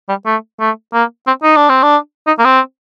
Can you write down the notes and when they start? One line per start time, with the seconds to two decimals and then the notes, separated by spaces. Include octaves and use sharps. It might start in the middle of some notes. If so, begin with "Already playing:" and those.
0.09 G3
0.26 A3
0.60 A3
0.93 A#3
1.27 C4
1.43 D#4
1.56 D4
1.69 C4
1.83 D4
2.27 D#4
2.39 A#3
2.45 C4